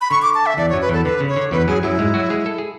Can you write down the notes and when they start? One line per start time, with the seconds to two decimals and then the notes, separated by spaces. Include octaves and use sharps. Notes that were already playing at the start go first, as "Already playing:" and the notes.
0.01 B5
0.11 D3 C#6
0.22 D6
0.35 A5
0.46 E5
0.57 E2 E3 D5
0.69 C#5
0.73 F#2 F#3
0.81 B4
0.89 E2 E3 A4
1.05 D3 B4
1.20 C#3
1.28 C#5
1.36 D3
1.51 E2 E3 B4
1.67 F#2 F#3 G#4
1.83 F#2 F#3 E4
1.99 G#2 G#3
2.14 F#3 F#4
2.30 G#3 G#4
2.46 A4
2.58 G#4